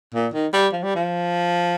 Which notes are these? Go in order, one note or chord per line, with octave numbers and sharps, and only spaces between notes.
A#2
D#3
G3
F3
G3
F3